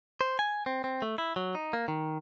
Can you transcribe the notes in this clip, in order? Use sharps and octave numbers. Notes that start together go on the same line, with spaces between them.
C5
G#5
C4
C4
A3
E4
F#3
D#4
A#3
D#3